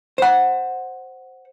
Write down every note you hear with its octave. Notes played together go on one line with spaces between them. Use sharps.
C5 F#5